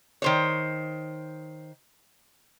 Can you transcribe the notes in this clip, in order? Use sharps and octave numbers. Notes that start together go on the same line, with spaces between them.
D#3 C5 C#5